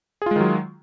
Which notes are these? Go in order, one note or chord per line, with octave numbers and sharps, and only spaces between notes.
D#3 F#3 G#3 F4 G#4